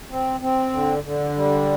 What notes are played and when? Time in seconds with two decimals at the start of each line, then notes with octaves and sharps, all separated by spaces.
0.09 C4
0.40 C4
0.72 D3
1.03 D3
1.35 G3